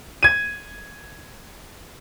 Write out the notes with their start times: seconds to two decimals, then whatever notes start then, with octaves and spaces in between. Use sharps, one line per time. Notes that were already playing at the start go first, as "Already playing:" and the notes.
0.23 G#6 D#7